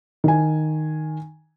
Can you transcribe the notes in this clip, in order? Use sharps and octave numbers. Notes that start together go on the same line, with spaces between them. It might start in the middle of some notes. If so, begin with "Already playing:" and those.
D#3 G#5